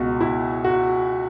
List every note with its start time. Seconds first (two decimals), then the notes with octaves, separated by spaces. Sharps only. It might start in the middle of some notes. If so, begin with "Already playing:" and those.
Already playing: C#2 B2 F#4
0.21 E4
0.64 F#4